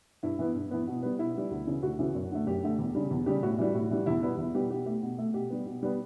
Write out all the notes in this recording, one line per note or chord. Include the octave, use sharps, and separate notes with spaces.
G2 E4
E3 B3
G2
E3 B3
B2
G3 B3
B2 E4
G3 B3
D2
C#3 E3
D2 F#4
C#3 E3
F#2
D3 A3
F#2 G4
D3 A3
E2
C#3 G3
E2
C#3 G3 G4
A2 F#4
E3 G3
A2
E3 G3
E2 E4
B2 G3 B3 E4
E2 E4
B2 G3 B3 G4
B2 G4
A3 G4
B2
A3
B2 G4
G3 B3
B2
G3 B3